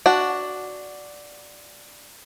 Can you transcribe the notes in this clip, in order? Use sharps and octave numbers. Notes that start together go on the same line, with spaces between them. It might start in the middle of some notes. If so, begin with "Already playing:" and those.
D4 F#4